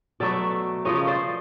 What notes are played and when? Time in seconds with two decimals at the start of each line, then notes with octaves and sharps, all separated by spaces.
0.20 B2 F#3 A3 D5 E5
0.85 C#3 F3 A3 C#5 D#5
1.07 C5 D5